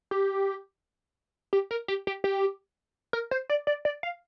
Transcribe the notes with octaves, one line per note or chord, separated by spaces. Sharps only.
G4
G4
A#4
G4
G4
G4
A#4
C5
D5
D5
D5
F5